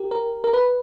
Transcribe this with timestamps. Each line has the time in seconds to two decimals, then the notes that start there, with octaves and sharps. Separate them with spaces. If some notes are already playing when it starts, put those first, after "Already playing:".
Already playing: G4 A#4
0.11 A#4
0.44 A#4
0.53 B4